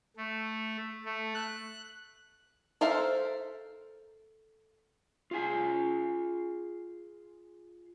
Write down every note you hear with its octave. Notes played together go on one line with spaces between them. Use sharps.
A3
A3
F#6
A4 A#4 C5 E5 F5
F4 G#4 G#5